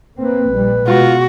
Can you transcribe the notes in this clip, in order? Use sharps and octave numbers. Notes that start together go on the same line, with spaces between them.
A#3 C4 B4
A#1 G3
B2 G#3 F4 F#4